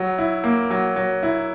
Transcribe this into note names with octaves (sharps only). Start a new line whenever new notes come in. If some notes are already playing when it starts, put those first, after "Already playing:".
Already playing: F#3
E4
A#3
F#3
F#3
E4